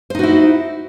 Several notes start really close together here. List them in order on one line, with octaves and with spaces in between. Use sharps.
C5 D#4 F#4 E4